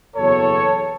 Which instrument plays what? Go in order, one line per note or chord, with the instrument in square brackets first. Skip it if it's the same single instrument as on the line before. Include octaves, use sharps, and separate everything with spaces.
[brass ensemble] F#1 E2 B2 F#3 A4 C#5